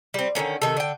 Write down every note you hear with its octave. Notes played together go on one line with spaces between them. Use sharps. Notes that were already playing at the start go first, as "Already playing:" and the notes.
G3 C4
D3 D#3 A#3 C#4
C3 D#3 A4
D3 G5